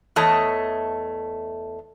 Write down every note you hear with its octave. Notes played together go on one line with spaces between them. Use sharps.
E2 A3 C#5 D#5 A5